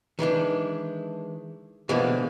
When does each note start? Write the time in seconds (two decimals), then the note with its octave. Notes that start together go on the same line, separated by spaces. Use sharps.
0.19 D#3 E3 G#3 D4
1.89 B2 D3 E3 F3 G#3 A#3